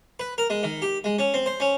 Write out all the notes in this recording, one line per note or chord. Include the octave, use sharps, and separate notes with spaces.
B4
A#4
G#3
D#3
G4
G#3
C#4
C4
C5
C#4